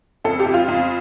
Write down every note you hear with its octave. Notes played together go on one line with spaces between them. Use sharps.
F2 A4
G4
F2
F4
F2